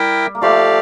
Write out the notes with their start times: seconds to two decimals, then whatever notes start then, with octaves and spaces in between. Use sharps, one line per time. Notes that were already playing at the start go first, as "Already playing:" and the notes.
Already playing: G3 E4 A#4 E5 G5
0.35 A#3
0.42 F3 A3 G4 D5 F5